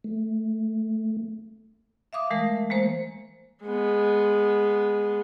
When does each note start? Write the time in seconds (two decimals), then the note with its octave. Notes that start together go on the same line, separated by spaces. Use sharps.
0.04 A3
2.13 E5 F5 D6 D#6
2.30 E3 G#3 A3 A#4
2.70 G#3 A#3 C5
3.63 G#3 B3